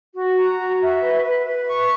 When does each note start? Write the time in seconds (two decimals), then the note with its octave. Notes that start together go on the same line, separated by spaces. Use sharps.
0.15 F#4
0.37 A#5
0.58 F#4
0.80 E5
1.01 B4
1.23 B4
1.45 B4
1.67 C#6